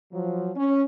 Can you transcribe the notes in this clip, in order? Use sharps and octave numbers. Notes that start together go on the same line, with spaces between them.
F3 F#3
C#4